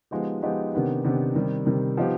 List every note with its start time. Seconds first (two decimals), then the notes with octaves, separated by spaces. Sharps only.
0.11 F3 G#3 B3 D#4 G4
0.43 F3 G#3 B3 D#4 G4
0.74 C3 D#3 B3 D4 G4
1.04 C3 D#3 B3 D4 G4
1.35 C3 D#3 G3
1.66 C3 D#3 G3
1.97 F3 B3 D#4 G4